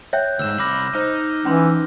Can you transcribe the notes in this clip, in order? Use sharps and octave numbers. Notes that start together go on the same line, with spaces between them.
C#5 E5 G5 F#6 G6
D2 G#2 E6 E7
C2 B5 D6 F6 A#6
D#4 C5 F6
E3 C#4 B5 C6